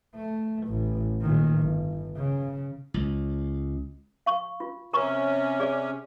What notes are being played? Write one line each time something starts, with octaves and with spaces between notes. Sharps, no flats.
A3
A1
A#2 D#3
G1
C#3
C#2
F5 C#6
F4
C3 C#4 A#4 A#5 C#6
G#4 D5